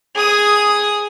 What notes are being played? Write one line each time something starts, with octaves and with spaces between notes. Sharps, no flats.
G#4 D#6